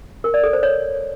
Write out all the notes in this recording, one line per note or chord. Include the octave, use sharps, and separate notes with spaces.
A#4
D5
A4
C5
C#5